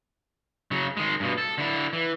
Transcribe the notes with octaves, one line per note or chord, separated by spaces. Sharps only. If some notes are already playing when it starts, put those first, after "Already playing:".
C#3 F#3
D#3 G#3
G2 B2
A4
D3 E4
E3